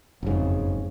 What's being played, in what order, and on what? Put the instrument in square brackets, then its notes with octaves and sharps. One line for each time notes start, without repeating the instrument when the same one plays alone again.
[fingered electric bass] F#1 G#2 [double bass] F2 C#3